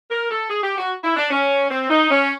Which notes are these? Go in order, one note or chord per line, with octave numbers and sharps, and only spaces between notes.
A#4
A4
G#4
G4
F#4
E4
D4
C#4
C4
D#4
C#4